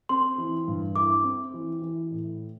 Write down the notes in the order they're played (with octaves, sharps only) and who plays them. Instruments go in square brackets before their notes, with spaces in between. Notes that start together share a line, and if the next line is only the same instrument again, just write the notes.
[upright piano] C4 [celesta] C6
[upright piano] E3
G2
[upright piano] E4 [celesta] D6
[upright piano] C4
E3
E3
A2